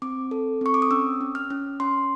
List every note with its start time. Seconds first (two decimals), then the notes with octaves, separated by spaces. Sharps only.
0.02 C4 D6
0.31 A4
0.61 C4 C#6
0.74 D6
0.82 D#6
0.91 C#4 E6
1.21 C#4
1.35 F6
1.50 C#4
1.80 C#4 C6